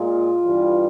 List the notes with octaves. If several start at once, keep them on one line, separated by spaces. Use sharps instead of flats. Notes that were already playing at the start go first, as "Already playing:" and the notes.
Already playing: A#2 G#3 F4
G2 E3 G3